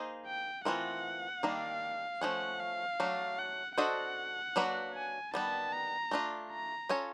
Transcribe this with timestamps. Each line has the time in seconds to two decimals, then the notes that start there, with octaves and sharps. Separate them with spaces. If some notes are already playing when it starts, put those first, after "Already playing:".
Already playing: A#3 D#4 G#4 C5 D#5
0.26 G5
0.65 E3 A3 C4 F4 A#4 F#5
1.43 D#3 G3 A#3 D4 F5
2.21 F3 A3 C#4 F#5
2.60 F5
3.00 F#3 A3 D4
3.39 F#5
3.77 D4 F#4 A4 C5 D#5 F#5
4.56 F#3 A#3 D4 F#4 B4
4.94 G#5
5.34 D#3 G3 B3 A5
5.72 A#5
6.11 A3 D4 F4
6.51 A#5
6.89 C#4 F4 A4 C#5